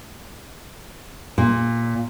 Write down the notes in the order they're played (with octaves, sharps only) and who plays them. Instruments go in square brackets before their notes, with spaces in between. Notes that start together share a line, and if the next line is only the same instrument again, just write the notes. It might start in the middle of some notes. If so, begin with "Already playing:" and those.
[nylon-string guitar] A#2